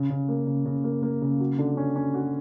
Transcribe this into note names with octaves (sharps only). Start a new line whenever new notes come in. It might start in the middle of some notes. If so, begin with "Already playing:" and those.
Already playing: C#3
C#3
A#3
C#3
C#3
A#3
A#3
C#3
F#3
D3
C#4
C#4
F#4